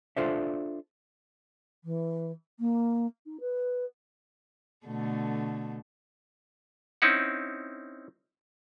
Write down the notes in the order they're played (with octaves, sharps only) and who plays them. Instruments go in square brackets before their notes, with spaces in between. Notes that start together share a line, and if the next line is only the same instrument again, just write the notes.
[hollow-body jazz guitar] D4 F4 A4 C5 D5 E5
[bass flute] E3
A#3
D#4
B4
[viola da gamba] B2 D3 A3
[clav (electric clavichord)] C4 C#4 D#4 E4 F#5